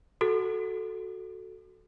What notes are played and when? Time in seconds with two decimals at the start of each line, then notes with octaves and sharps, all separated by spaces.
0.21 F#4 A4